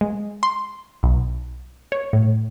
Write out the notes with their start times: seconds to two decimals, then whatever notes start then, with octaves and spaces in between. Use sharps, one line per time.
0.01 G#3
0.43 C6
1.03 B1
1.92 C#5
2.13 A2